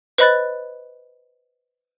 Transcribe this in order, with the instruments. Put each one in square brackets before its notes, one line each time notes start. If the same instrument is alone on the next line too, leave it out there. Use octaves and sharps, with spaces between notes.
[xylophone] B4 C5 D#5 B5 F#6 A6